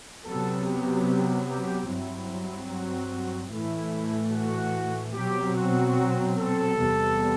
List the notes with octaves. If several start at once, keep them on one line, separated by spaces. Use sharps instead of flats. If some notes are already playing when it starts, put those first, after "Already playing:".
C3 F#3 B3 A4
G4
G4
G2 F#3 C4 E4
F#4
A2 E3 A3 E4
F#4
B2 F#3 C4 G4
F#4
A4
E2 C3 G3 B3